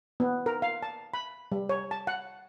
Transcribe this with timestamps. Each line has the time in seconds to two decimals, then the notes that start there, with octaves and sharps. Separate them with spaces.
0.20 B3
0.46 A#4
0.62 F5
0.83 A5
1.14 B5
1.52 G3
1.69 C#5
1.91 A5
2.07 F#5